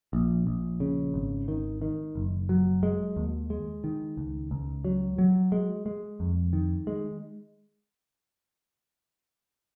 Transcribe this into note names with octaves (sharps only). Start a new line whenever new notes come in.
A#1
A#1
C#3
G#1
D#3
D#3
F#1
F#3
G#3
D#2
G#3
D#3
C#2
C#2
F#3
F#3
G#3
G#3
F2
D#3
G#3